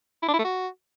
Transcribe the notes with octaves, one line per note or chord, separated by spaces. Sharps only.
E4
D4
E4
A3
F#4